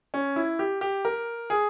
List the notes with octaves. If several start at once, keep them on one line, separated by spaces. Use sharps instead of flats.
C#4
E4
G4
G4
A#4
G#4